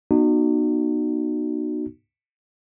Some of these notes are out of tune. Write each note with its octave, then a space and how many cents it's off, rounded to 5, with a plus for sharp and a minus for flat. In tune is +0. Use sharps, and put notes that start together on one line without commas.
B3 -30 D#4 -35 F#4 +0